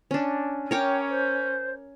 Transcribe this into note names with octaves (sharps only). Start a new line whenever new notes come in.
C#4 D4
C#4 A#4 C#5 G5 D6
C5